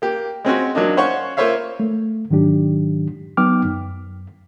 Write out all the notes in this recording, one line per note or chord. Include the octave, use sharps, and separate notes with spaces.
A#3 G4
G#3 C4 C#4 F#4
F#3 A#3 D4 D#4
C#4 C5 C#5 F5 F#5 C#6
A#3 F4 C5 C#5 E5 F5
A3
G#2 D#3 F#3 D4 G4
F#3 B3 D#4 G5 D6 F6
F#2